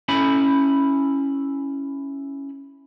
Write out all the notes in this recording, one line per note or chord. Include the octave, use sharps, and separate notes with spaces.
C#4 E4 B5